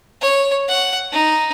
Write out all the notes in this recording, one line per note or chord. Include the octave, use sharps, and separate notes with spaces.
C#5
F#5
D#4